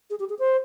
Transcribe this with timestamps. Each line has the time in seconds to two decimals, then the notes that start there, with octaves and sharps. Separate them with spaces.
0.10 G#4
0.20 G4
0.30 G#4
0.39 C5